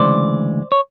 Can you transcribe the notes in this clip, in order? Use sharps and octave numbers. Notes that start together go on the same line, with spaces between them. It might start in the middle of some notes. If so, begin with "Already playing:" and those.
Already playing: D2 C#3 E3 G#3 C5 D5
C#5